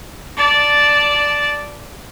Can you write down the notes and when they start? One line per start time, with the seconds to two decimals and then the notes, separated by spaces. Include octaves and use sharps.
0.37 D5 A5